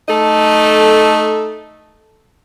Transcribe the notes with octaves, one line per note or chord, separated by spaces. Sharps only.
A3 D#4 A4